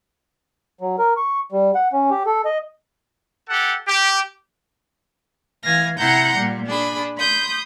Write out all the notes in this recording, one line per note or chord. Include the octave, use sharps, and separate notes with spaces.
F#3
A#4
C#6
G3
F#5
C#4
G4
A4
D#5
G4 A4 F#5
G4
E3 F5 G#5 A#6
C3 E4 F#5 A#5 C6 G6
A#2 G3
D4 G#4 B5
B5 C6 D#6 G6